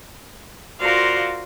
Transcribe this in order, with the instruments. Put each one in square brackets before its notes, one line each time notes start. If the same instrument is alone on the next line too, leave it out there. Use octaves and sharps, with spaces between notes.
[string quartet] F4 F#4 A#4 C5 D5 F5